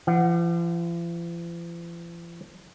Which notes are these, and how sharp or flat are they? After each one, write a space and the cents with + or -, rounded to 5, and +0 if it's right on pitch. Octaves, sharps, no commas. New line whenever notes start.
F3 -45 F#5 +0